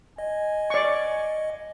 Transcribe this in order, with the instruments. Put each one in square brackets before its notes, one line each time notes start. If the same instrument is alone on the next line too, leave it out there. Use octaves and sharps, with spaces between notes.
[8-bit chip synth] D#5 [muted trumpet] G#5
[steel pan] D5 C#6